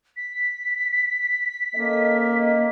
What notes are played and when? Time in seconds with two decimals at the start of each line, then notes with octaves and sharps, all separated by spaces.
0.17 B6
1.76 A#3 C#4 A4 D#5